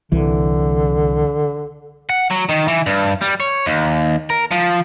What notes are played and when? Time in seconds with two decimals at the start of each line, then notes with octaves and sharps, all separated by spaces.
0.12 C2 D3 E3
2.10 F#5
2.31 F#3
2.49 D#3
2.68 E3
2.86 G2
3.21 G3
3.40 C#5
3.66 D#2
4.30 A#4
4.51 F3